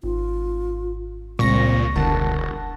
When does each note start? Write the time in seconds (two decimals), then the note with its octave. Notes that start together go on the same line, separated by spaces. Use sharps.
0.03 G#1 F4
1.39 C#2 A#2 G3 C4 C#6 A#6
1.96 E1 D3 A#4 F#5 A5